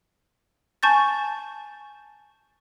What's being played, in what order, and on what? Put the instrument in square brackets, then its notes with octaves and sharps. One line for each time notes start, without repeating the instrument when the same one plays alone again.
[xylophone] G#5 A5 C#6 G6 A6